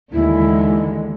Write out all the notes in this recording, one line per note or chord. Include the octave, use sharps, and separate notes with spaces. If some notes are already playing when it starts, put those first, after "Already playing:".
D#2 D3 E3 G#3 E4